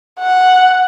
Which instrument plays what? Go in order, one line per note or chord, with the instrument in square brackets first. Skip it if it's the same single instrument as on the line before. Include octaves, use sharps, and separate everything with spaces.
[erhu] F#5